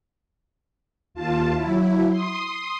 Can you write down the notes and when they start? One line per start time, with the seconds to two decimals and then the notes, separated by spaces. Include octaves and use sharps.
1.14 D#2 F4 A5
1.54 F#3 E4
2.10 C6 D#6